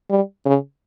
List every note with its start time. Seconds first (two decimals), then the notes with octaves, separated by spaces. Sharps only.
0.10 G3
0.46 C#3